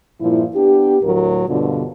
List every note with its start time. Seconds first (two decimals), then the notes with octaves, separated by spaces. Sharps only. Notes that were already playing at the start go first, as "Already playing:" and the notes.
0.20 G2 A#2 F3 E4
0.55 B3 D4 G4
1.02 D2 A2 F#3 A#4
1.49 G2 B2 D3 F4